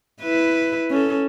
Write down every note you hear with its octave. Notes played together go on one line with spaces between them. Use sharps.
E4 B4
C#4 A4